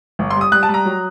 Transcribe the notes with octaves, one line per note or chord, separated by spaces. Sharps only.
G1
C6
G3
D#6
G3 F#6
A5
G3
A#5
F#3